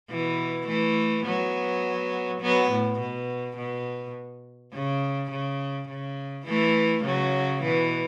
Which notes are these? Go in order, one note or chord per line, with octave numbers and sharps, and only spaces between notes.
B2 E3
E3 A3
F#3 B3
F#3 B3
A2
B2
B2
C#3
C#3
C#3
E3 A3
C#3 F#3
B2 E3